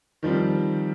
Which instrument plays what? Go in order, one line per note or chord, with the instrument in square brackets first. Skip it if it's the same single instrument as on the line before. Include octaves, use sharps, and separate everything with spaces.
[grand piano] D#3 F3 G3 C4